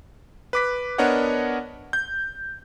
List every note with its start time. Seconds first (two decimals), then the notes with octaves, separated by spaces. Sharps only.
0.53 B4 D6 B6
0.98 B3 D4 A#4 C#5 D#5 F#5
1.93 G6